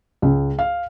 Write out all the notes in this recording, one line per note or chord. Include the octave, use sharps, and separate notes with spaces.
C#2
F5